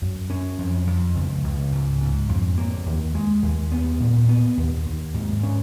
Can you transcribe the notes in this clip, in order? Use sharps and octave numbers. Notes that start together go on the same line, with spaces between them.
F#2
C#4
F2
F2
C#2
C#2
G#2
G#2
F2
A#3
D#2
G#3
D#2
B3
A#2
B3
D#2
D#2
G#2
C#4